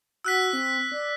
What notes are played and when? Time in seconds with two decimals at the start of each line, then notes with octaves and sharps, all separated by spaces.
0.25 F#4 E6 F#6 B6
0.53 C4
0.92 D5